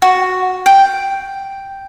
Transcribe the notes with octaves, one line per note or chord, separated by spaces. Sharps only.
F#4
G5